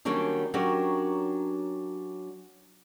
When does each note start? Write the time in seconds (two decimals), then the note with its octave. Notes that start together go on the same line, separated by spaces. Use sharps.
0.05 D#3 F#3 G3 A#3 C#4 D4
0.54 F#3 C#4 D4 G4 A#4